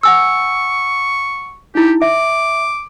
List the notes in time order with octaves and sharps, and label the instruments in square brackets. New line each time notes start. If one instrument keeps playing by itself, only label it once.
[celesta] F#5 G#5 E6 [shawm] C#6
[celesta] D#4 E4 [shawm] G4
[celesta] E5 [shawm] D6